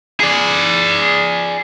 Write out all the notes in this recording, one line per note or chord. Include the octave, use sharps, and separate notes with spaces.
G#4 D5